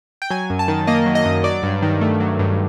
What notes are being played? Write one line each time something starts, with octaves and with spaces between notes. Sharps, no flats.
G5
F#3 G#5
F#2
A5
D#3
A#3 D#5
F#3
D#5
F#2
F#3 D5
G2
D#3
A3
F#3
G2